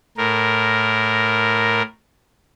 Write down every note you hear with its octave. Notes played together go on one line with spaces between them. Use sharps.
A2 A#4